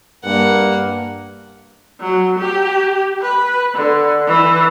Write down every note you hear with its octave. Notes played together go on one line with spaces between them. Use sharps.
G2 A#3 F#5
F#3
G4
B4
D3
E3